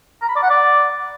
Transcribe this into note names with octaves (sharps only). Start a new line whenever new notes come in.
A#5
B5
D5
F#5
D5